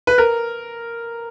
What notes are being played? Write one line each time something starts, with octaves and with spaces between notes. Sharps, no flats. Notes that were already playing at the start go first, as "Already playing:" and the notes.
B4
A#4